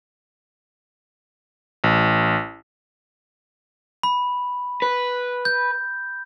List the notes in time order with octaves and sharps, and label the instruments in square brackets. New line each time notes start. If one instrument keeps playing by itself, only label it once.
[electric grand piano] A1
[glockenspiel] B5
[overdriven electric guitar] B4
[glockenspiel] G6